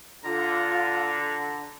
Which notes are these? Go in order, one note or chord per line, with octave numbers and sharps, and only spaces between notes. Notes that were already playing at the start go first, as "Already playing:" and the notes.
D3 F4 A#5